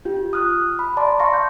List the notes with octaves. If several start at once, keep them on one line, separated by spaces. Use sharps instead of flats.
F4 G4
D#6 F6 F#6
B5
D5 A5 A#5 C6 D6
F5 A5 C6 C#6 A#6
G6